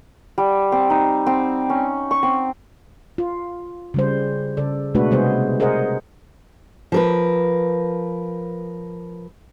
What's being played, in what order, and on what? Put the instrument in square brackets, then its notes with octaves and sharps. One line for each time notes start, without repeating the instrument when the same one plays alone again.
[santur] G3
C4
D#4
C4
C#4
C#6
C4
[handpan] F4
C#3 G3 C5
C#3 A4 D5
B2 G#3 A3 D4 F#4 B4
C3 G3 G#3 B3 G#4 C5
G#4 A#4 C5 D#5 F#5
[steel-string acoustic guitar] F3 A#4 B4